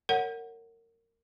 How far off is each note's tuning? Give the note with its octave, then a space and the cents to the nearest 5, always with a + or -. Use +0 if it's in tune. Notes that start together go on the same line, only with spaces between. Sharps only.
A#4 -25 C#5 +0 F#5 +0